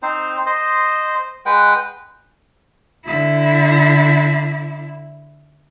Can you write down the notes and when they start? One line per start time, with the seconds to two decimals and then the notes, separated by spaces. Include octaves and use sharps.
0.03 C4 D#4 C5
0.46 C5 D#5
1.46 G#3 B4 F#5 G5
3.06 D3 E4